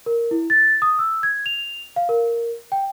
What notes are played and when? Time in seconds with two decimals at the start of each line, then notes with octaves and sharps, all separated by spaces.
0.06 A#4
0.31 E4
0.50 A6
0.82 D#6
0.99 E6
1.23 G#6
1.46 F7
1.96 F5
2.09 A#4
2.72 G5